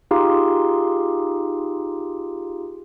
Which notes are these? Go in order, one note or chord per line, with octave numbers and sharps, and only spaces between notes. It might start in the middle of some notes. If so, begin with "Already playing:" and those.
D#4 F4 G4 G#4 F5 C6